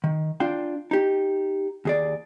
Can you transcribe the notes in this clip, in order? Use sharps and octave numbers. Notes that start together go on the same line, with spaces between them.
D#3
D4 F4 G5
D#4 G4
D#2 G#4 D5